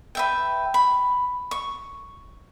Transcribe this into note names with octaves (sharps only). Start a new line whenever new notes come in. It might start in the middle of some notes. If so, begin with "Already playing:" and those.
B4 E5 G5
B5
C#6